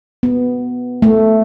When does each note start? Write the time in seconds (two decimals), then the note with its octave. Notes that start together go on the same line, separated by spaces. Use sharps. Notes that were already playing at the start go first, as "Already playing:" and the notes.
0.23 B3
1.02 A3